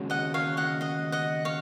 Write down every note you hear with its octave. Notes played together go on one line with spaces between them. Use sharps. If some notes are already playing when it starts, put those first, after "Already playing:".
Already playing: D#2 C#3 G#3 C#4 F#4
D#5 F#5
C#5 F5
D#5 F#5
D#5 F#5
D#5 F#5
C#5 F5